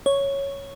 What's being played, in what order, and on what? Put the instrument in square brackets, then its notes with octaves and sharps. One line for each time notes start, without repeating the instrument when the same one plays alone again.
[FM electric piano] C#5